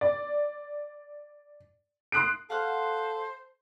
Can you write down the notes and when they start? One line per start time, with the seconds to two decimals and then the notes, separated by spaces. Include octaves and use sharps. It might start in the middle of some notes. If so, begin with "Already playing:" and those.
0.01 D5
2.12 C6 D#6 F#6 C7 D7
2.50 A4 C5 F5 F#5 F#6